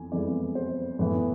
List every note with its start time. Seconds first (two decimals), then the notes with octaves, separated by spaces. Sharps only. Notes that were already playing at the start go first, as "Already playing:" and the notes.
Already playing: F2 E3 B3 G#5
0.11 F2 E3 G#3 B3 D5
0.55 C5
0.99 A2 E3 B3 B4